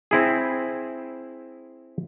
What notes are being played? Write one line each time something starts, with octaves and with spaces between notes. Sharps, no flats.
C4 E4 G#4